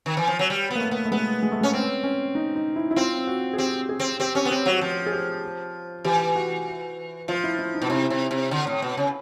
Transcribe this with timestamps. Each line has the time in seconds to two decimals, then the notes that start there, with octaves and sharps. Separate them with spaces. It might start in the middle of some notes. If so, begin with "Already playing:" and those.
0.06 D#3
0.17 E3
0.28 F3
0.39 F#3
0.50 G3
0.71 A#3 B3
0.81 A3
0.91 B3
1.05 A3
1.11 G#3 B3
1.42 G#3
1.52 A3
1.61 G#3 C#4
1.73 C4 C#4
2.04 C#4
2.35 D#4
2.56 D#4
2.76 E4
2.91 E4
2.96 C4 F4
3.27 F#4
3.54 G#4
3.58 C4 G4
3.89 G#4
4.00 C4
4.20 C4 G4
4.35 C#4 G4
4.45 B3
4.50 C4 G4
4.66 F#3 F#4
4.75 G4
4.81 F3 F#4
5.06 G#4
5.12 G4
6.05 E3 G4
6.36 F#4
7.28 F3 F4
7.44 E4
7.59 E4
7.74 D#4
7.82 B2
7.90 C3 E4
8.10 C3
8.31 C3
8.51 D3
8.67 A2
8.82 B2
8.97 C#3